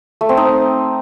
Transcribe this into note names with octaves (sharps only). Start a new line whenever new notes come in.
A3
C4
D#4